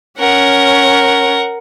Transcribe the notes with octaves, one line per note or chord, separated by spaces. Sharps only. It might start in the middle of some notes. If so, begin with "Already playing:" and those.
C#4 A#4 F#5